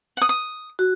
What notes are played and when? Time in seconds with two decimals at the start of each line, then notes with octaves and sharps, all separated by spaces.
0.17 F#5 D#6
0.29 D#6
0.79 F#4